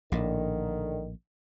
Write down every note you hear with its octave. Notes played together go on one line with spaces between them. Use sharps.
A#1 A2 D3 D#3